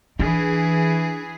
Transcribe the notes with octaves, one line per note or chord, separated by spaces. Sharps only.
E3 D4 G#4